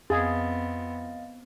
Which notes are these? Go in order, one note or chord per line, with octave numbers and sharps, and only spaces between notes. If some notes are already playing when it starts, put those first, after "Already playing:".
F2 B3 C4 G#4 D#5 F5 A6